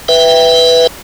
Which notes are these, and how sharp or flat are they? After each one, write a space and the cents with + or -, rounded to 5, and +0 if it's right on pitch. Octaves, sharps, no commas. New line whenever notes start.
B4 +0 E5 +0 G5 +10